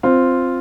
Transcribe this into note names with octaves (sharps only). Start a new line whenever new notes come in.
C4 F4